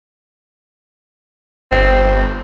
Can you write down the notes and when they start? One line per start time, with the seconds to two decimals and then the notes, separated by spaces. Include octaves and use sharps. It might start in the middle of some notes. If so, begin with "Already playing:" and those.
1.72 G1 C4